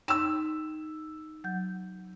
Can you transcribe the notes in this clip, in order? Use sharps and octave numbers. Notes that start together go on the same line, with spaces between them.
D#4 G5 C6 E6 E7
F#3 F#5 G6